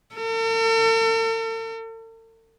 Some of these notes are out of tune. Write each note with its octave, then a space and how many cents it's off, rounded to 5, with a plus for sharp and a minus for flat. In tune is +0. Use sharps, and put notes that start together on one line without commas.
A4 +45